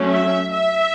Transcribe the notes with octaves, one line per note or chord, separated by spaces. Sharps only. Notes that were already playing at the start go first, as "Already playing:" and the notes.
Already playing: F#3 A3 C#4
E5
E5